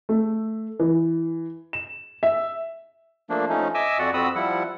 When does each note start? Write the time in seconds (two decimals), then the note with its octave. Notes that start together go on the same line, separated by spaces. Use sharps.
0.09 A3
0.80 E3
1.73 E7
2.23 E5
3.30 F3 A3 A#3 D4
3.50 F3 A3 C#4 D#4
3.74 D#5 E5 G#5 D6 E6
3.99 F2 F#4 D5 F#5
4.14 F2 C4 F#4 B5 D#6 E6
4.35 F3 G3 E4 F#5